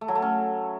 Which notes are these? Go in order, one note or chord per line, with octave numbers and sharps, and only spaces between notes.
A3
F#3
A3
C#4